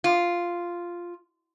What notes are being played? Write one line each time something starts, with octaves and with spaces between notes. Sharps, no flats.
F4